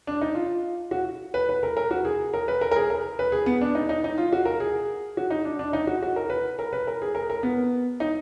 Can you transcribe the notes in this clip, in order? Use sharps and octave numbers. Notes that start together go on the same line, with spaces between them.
D4
D#4
F4
F#4
B4
B4
A#4
A#4
F#4
G#4
A#4
B4
A#4
A#4
G#4
A#4
B4
G#4
B3
D4
D#4
D#4
D#4
F4
F#4
A#4
G#4
F#4
D#4
D4
D4
D#4
F#4
F#4
A#4
B4
A#4
B4
A#4
G#4
A#4
A#4
B3
D#4